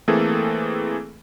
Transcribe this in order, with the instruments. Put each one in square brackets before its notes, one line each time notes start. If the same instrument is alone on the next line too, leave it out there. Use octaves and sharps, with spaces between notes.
[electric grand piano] E3 A3 A#3 C4 G#4 A4